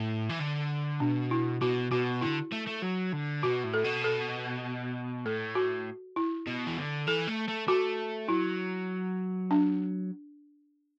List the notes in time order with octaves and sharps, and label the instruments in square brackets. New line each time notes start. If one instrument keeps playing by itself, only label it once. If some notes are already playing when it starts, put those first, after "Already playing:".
Already playing: [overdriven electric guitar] A2
E3
D3
[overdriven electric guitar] B2 [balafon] D4
[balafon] E4
[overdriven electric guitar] B2 [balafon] F#4
[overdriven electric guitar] B2 [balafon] F#4
[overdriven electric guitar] D3 [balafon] E4
[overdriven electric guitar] A3
A3
F#3
D3
[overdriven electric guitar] B2 [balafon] F#4
[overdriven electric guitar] A2
[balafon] A4
[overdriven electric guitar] B2
[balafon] A4
[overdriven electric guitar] A2 [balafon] A4
[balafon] F#4
E4
[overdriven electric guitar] B2
E3
D3
[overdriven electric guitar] E3 [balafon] A4
[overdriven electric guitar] A3
A3
[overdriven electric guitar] A3 [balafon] F#4
[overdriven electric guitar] F#3 [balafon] E4
[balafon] D4